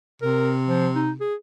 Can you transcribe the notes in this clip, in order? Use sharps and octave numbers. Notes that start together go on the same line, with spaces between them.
C3 A#4
F3
D#4
G#4